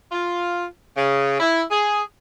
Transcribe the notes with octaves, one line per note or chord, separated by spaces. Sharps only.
F4
C#3
E4
G#4